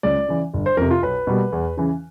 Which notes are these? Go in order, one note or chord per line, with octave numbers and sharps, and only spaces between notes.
C#2 D5
C#3 E3
G1
C5
F2 C3 A#4
F4
B1 B4
B2 G3 A#3
E2
C#3 E3